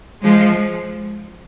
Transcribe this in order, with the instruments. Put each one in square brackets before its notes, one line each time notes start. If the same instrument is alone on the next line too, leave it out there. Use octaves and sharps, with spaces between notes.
[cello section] F3 G#3